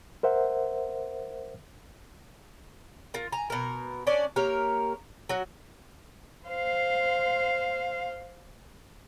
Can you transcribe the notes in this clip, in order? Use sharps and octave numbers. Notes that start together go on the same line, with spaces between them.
A#4 C5 E5 F#5
F4 A#4
G#5 A#5
B2 A#4
C#4 D4 D5
A#3 G4 A#4 C#5
F#3 F#4
C5 F5